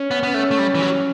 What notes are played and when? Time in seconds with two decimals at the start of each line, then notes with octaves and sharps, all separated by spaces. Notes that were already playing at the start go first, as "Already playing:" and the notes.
Already playing: C#4
0.11 B3
0.23 B3
0.34 A3
0.51 A3
0.59 G3
0.75 E3
0.82 F#3